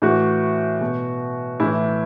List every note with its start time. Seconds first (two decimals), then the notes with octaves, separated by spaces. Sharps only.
0.02 A2 E3 F#4
0.81 B2
1.60 A2 E3 E4